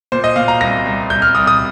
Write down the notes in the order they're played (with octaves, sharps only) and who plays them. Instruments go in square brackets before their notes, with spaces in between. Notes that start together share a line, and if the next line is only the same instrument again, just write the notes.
[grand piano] A#2 C5
D#5
A#2 F5
A#5
C2 A#6
C2
C2 G6
F6
C2 D#6
D#6